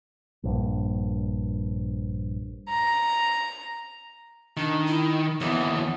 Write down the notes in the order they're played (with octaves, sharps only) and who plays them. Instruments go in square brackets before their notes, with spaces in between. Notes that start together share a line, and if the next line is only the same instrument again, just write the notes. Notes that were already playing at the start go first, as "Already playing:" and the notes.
[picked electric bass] A#1 G2
[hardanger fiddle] A#5
[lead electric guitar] D#3 [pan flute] D4
[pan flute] E4
[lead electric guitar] D#2 E3 [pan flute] B3